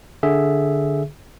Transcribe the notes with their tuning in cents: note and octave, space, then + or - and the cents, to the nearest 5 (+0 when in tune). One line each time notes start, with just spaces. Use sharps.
D3 +0 G#4 +0 E5 +0